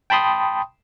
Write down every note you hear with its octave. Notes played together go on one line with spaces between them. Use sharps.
G5 A5 B5 C6 D#6